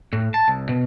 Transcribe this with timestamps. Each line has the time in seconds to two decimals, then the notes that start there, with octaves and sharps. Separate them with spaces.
0.13 A2
0.34 A5
0.48 C2
0.69 B2